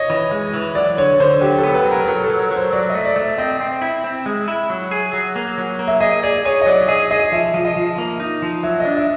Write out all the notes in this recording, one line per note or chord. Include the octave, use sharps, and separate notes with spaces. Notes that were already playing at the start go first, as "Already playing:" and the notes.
Already playing: C#5 D#5
E3
G#3
E3
F#3 D5
D3 C#5
D3 C5
F#3 G4
B3 A4
B4
F#3
A#4
F#3 A#4
A4
F#3
A#4
F#3
C5
F#3 D5
A3 D#5
D5
A3
C4 D#5
C4
E4
C4
G#3
E4
F#3
G#4
F#3
A#3
F#3
A#3
E5
G#4 D#5
G#4 D5
G#4 C#5
D#5
F#3 D5
G#4 D#5
G#4 D#5
F3 E5
F3
D#5
F3
A#3
D#4
F3
F#3 E5
D4 D#5
E5